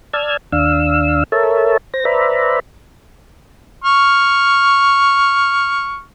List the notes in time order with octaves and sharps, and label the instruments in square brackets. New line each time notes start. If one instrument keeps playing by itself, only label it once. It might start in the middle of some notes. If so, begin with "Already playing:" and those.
[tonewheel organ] D5 A5 E6 F6 G#6
D#2 D4 F5 E6
A4 A#4 C#5 E5 A5
C5 A#6
B4 C5 D5 E5 A#5 B5
[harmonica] C#6 F6